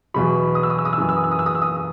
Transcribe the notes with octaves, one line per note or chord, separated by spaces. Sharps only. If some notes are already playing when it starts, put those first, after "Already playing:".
E2 B2 F#3 B5
D#6
E6
D#6
E6
D#6
E6
F#2 E3 D#6
E6
D#6
E6
D#6
E6
D#6
E6
D#6